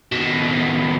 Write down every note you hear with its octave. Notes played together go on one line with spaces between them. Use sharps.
D#2 B2